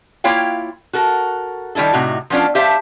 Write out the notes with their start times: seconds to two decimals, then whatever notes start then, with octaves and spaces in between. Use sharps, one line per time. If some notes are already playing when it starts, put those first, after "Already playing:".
0.24 A#3 E4 F4 C#5 F5 G5
0.93 F#4 A4 A#4
1.75 D#3 G3 D4 E4 A4
1.93 A2 C3 D#4 F#4
2.30 F3 B3 C#4 D4 F4
2.55 G4 C5 E5 F5 A5